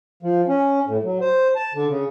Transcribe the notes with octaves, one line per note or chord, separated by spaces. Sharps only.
F3
C#4
A2
F#3
C5
A5
D3
C#3